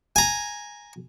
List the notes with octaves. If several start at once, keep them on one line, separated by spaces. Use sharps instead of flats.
G#5 A#5